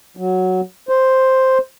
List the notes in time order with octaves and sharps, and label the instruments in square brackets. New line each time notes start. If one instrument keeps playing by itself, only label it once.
[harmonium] F#3
C5